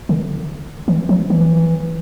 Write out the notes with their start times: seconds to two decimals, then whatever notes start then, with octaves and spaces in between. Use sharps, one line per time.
0.09 D3
0.88 E3
1.09 F3
1.30 E3